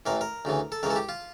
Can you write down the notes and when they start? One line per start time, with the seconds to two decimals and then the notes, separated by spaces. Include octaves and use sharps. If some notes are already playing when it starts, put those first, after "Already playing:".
0.06 A1 A2 E3 A#4
0.21 A#4
0.45 D2 C#3 E3
0.72 A4
0.83 C#2 C#3 E3 A#4
0.90 A4
0.96 G4
1.09 F4